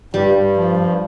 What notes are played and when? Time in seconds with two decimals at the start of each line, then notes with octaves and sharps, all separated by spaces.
0.14 G2 G3
0.35 G2
0.56 F3
0.77 G2